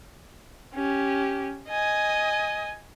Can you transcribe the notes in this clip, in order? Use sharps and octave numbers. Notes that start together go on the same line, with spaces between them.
C#4 G4
D#5 G#5